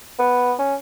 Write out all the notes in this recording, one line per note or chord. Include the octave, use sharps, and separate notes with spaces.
B3
C#4